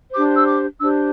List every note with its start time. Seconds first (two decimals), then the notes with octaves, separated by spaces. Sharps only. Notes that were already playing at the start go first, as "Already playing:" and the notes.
0.12 D4 G4 C5 D6
0.35 E6
0.46 D6
0.80 D4 G4 C5 E6